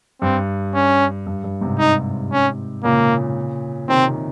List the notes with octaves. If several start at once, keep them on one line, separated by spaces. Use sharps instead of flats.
G2 C4
C#4
G2
G2
G#2 C3
D#4
C#4
A#2 C#3 A#3
C3 D#3 C4
C3